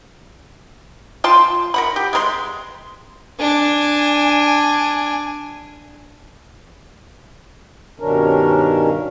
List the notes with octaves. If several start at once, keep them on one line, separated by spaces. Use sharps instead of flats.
F4 G5 A5 C6
A#4 F#5 B5
G4
G#3 A#4 C6
D4 G#5
G2 B2 D#3 C#4 D4 A#4